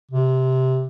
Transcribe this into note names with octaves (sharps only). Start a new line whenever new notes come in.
C3